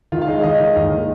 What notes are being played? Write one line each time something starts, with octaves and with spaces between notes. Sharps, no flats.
D#3 F4
F5
G#3 D#5
F5
D#3 D#5
D#3
D#2
D#3